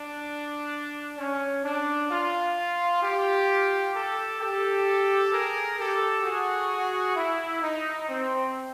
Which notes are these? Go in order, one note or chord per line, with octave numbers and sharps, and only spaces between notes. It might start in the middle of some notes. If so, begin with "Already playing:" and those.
Already playing: D4
C#4
D4
F4
F4 G4
G4 A4
G4 A4
G#4 A#4
G4 A4
F#4 G#4
E4
D#4
C4